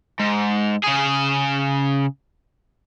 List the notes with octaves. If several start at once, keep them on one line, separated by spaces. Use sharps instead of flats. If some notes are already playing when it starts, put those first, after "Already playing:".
G#2
C#3 G#4